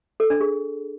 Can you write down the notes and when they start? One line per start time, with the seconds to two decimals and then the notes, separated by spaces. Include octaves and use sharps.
0.20 A4
0.30 D4
0.41 G#4